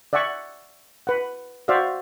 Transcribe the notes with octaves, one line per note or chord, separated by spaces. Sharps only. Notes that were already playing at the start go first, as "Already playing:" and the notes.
D5 E5 F#5 G#5 C#6
B4 F#5
F#4 C5 D5 E5 F5